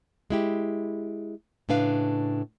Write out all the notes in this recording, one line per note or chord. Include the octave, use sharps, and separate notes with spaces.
G#3 E4 G4
A2 C#3 D4 B4 F5